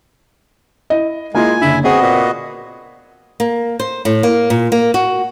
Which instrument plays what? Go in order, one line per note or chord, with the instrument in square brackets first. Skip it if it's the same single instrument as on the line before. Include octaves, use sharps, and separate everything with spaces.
[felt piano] E4 D#5
[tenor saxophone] G#3 [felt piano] A#3 E4 F4 [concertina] G#5
[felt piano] F#1 D3 [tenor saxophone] E4
[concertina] B3 F#4 D#5 [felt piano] C4 [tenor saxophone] G#4
[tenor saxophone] A#2
[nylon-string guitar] A#3
C5
A2
A#3
A#2
A#3
F#4